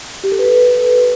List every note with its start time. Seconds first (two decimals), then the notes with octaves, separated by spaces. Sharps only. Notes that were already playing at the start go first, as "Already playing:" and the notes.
0.24 G4
0.32 A4
0.39 B4